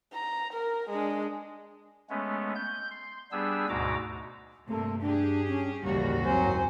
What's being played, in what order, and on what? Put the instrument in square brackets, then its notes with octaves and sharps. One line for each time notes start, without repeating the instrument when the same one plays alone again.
[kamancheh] A#5
A#4
G#3 D4
[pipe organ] G#3 A3 B3 C#4
G6
C6
G3 B3 D4 G#4 E6
D2 G#2 B2 F#4 A#5 D6
[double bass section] G2 [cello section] C3 A#3 [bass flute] A3
[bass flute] D4 [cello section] G4 G#4
[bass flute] C#4
[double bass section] A1 C#3 F3 [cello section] D#2 A#3 F#4 [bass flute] G3
[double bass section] F#1 G#2 C4 [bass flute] F#3 [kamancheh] C5 G#5